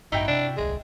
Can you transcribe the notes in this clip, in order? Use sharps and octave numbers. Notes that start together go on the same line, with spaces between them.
A1 G2 D#4 E4 F#4 G5
C3 D4
D#1 C2 G#3